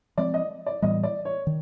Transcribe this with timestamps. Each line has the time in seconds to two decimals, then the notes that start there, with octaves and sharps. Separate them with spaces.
0.18 F3 G#3 C4 D5
0.34 D#5
0.66 D5
0.82 A2 E3 G3 B3 D#5
1.03 D5
1.25 C#5
1.47 D#3